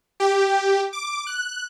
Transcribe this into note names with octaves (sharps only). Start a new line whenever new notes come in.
G4
D6
F#6